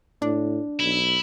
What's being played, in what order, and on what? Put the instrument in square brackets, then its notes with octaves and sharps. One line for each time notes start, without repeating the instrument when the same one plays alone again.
[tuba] A2 [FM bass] D4
[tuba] B1 [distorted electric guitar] E4